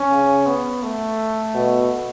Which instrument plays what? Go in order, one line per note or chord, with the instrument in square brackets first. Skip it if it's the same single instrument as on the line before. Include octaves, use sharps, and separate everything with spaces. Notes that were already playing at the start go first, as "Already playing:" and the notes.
Already playing: [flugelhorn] C#4
[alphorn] C#3
[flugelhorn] B3
A3
[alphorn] B2